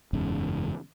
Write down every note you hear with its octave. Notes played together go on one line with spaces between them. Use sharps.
F#1 E2 G#2 C#3